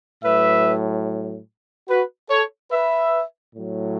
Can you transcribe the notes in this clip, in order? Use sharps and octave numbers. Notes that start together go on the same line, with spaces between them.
A2 F#3 B4 E5
F#4 B4
A4 C#5
B4 E5
A2 F#3